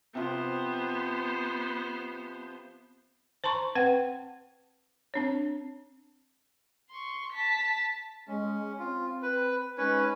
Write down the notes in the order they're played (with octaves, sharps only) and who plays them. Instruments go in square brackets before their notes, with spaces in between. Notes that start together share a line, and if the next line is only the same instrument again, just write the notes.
[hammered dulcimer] C3 F3 [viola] B3 C5
[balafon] C5 A5 A#5 C6 C#6
C4 B4 F#5 G5
C4 D4 C#5
[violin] C6 C#6
A5 B6
[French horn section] G#3 [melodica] C#4
[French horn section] C4 [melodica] F4
[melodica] B4
[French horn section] G#3 D#4 [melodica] C#4 B4 C#5